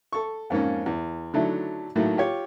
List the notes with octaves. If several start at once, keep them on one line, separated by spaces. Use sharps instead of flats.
A4 C#6
F2 G#2 A#3 C#4
E2
D3 D#3 F#3 A3 D4 E4
A2 D#3 F#3 A3 A#3 F#4
F4 G4 C#5